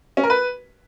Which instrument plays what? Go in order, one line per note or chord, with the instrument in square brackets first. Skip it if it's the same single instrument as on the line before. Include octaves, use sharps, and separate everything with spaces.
[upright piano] C#4
A#4
B4